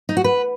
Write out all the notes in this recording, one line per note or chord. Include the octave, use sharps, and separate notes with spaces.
D#4
F#4
B4